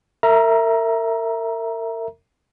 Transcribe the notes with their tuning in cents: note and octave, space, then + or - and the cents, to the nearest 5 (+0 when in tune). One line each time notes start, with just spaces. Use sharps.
A#4 -35 E5 +0 A#5 +15